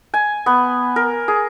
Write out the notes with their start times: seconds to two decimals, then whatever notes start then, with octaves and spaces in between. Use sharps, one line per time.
0.14 G#5
0.46 B3
0.96 A#4
1.28 G#4